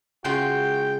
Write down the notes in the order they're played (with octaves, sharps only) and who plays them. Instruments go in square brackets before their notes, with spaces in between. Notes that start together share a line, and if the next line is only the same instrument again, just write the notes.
[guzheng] C#3 G#3 F4 [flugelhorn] F#4 [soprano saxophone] G5